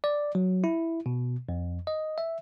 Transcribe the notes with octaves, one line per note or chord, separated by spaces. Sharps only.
D5
F#3
E4
B2
F2
D#5
E5